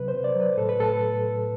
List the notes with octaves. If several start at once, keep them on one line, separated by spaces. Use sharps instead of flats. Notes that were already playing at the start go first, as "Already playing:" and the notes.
Already playing: C3 F#3 B4
C5
C3
D5
F#3
B4
A2 A4
B4
A2 A4